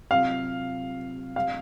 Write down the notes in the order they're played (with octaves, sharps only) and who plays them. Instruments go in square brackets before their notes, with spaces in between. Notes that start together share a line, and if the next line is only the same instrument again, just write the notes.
[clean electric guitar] C3 F#3 C4 F4 [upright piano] F5
[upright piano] F5